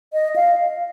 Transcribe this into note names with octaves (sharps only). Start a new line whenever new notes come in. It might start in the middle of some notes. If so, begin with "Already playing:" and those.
D#5
F5